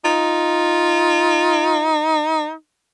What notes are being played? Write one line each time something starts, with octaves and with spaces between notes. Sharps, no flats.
D#4 F4